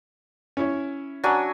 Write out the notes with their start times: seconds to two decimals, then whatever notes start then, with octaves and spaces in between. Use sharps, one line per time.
0.57 C#4 E4 C#5
1.24 F#3 D4 G#5